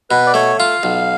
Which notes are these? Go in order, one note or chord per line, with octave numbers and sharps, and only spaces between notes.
B2 B4
D5
A3 C#5
F4 F5
B1